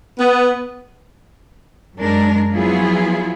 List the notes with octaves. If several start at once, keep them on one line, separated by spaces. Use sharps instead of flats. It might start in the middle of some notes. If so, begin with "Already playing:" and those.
B3
F#2 G#3 D4 A#4
F3 F#3 B3 E4 F4 G#4